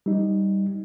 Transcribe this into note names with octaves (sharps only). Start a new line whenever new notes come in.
G3 D#4